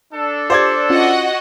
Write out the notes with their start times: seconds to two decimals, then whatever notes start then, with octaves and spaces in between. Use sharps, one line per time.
0.14 D4 A4
0.50 F4 G4 C5 D5 G#6
0.90 C#4 F4 F#4 D#5 F#5